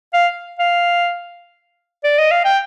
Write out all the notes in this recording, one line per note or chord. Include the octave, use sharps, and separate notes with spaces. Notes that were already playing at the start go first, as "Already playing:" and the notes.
F5
F5
D5
D#5
F5
G5